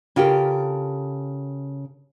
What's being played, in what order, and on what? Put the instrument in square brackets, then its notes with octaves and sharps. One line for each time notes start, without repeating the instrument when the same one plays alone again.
[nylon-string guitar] C#3 F4 G4 A4 A#4